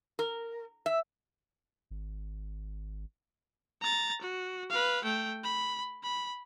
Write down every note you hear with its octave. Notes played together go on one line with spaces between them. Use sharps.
A#4
E5
G#1
A#5 A6
F#4
B4 F5
A3 G5
B5
B5